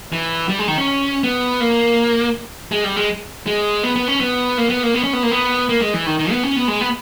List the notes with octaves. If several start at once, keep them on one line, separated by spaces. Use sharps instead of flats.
E3
G3
G#3
D#3
C#4
B3
A#3
G#3
G3
G#3
G#3
B3
B3
C#4
B3
A#3
B3
A#3
B3
C#4
B3
A#3
B3
A#3
G#3
E3
D#3
D#3
B3
C#4
B3
G#3
B3